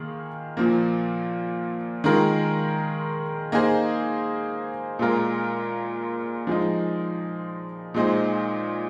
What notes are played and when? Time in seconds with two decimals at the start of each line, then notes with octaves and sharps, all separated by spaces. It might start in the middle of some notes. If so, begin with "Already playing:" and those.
Already playing: D#3 A#3 F4 G#4
0.57 A#2 F3 A#3
2.04 D#3 G#3 F4 A#4
3.52 A#3 D#4 G#4 C5
4.99 A#2 G#3 F4 A#4
6.47 F3 G#3 D#4
7.94 A#2 G#3 D#4 C5